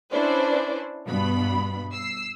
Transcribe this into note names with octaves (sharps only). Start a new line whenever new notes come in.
C#4 D4 E4 B4 C5 D5
G2 B2 B3 B5
E6 C7